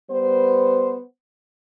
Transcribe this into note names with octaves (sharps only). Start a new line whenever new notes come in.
G3 B3 B4 C5